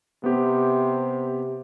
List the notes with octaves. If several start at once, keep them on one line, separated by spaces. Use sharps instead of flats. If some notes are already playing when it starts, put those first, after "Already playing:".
C3 B3 G4